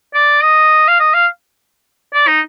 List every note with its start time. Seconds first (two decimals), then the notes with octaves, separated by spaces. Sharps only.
0.14 D5
0.43 D#5
0.88 F5
1.00 D#5
1.14 F5
2.14 D5
2.27 D#4